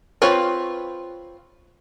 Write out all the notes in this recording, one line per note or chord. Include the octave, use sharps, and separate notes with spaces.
C4 F4 B4 C#5